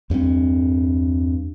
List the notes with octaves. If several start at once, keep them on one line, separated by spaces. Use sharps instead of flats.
E2 G2 B3 C4